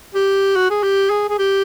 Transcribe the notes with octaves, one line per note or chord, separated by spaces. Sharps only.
G4
F#4
G#4
G4
G#4
G#4
G4